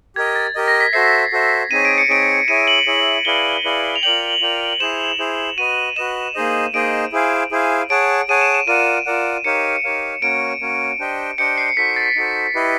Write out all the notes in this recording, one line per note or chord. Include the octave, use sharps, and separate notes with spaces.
G4 A#4 D#5 G#6
A6
G4 A#4 D#5
A#6
B6
F#4 A4 C5 E5 C7
F#4 A4 C5 E5
C4 D#4 G#4 C#5 D#7
D7
C#7
C4 D#4 G#4 C#5 D7
E4 G#4 C#5 E5 D#7
F#7
E4 G#4 C#5 E5
E4 G#4 B4 D5 F5 G7
E4 G#4 B4 D5 F5
F7
F4 A#4 D5 G5 F#7
F4 A#4 D5 G5
E4 G#4 C5 E7
E4 G#4 C5
F#4 B4 D#5 D#7
F#4 B4 D#5 E7
A#3 D#4 G#4 C5 D#5
A#3 D#4 G#4 C5 D#5 D7
E4 G#4 C5 F5 G#5
E4 G#4 C5 F5 G#5
G#4 C#5 F#5 A5 D7
G#4 C#5 F#5 A5 D#7
E7
E7
F4 A#4 D5 F#5 D#7
F4 A#4 D5 F#5
D#4 G4 A#4 C#5 F5 C#7
D#4 G4 A#4 C#5 F5
A#3 C#4 F#4 A#4 C#5 D7
A#3 C#4 F#4 A#4 C#5
D4 G4 C5 D#5 G5
D4 G4 C5 D#5 G5 C#7
C7
D#4 F#4 A4 C5 B6
A6
D#4 F#4 A4 C5
E4 G4 B4 D#5